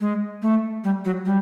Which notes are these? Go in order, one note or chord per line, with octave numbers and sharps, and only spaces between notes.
G#3
A3
G3
F#3
G3